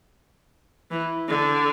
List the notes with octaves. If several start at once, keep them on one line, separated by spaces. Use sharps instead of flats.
E3
D3